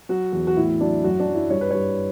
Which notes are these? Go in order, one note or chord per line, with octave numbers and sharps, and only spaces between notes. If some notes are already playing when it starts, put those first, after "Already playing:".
F#3 F#4
E2 F#4
F#4
A2 E4
F#3 D4
F#2 F#4
D4
F#2
E4
G2 C#5
B4
G2 C#5